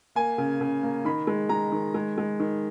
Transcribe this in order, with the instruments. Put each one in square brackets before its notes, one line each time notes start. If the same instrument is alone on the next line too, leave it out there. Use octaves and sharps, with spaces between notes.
[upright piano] A#3 G#5
C#3
C#3
A#3
D#3 B5
G#3
G#3 A#5
D#3
G#3
G#3
D#3